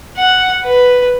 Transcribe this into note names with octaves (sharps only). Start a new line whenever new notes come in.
F#5
B4